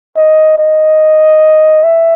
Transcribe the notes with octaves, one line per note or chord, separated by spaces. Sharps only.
D#5
D#5
E5